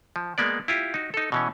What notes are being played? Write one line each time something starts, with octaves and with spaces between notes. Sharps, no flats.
F3
G#3 A#3 B3 D5
E4 F4 G4
D#4 F#4
D#4 A4
B2 E3 C#4